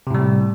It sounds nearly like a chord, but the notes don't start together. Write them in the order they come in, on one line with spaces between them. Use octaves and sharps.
C3 A2 G3